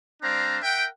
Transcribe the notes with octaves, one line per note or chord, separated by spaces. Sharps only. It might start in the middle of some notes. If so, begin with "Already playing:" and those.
G3 C4 D4 C5 F5 A#5
A#4 E5 F#5 G5